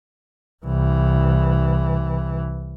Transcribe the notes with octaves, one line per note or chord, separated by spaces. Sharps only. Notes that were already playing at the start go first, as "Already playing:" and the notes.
C2 E3